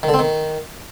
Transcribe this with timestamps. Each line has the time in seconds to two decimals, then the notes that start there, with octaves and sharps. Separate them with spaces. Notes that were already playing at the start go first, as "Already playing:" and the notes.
0.03 D#3
0.09 D3
0.14 C4
0.19 D#3